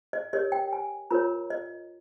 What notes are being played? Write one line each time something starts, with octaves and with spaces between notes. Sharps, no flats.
D#5
G4 A#4 C#5 D#5
G5
G#5
F4 A#4 C#5 A#5
D#5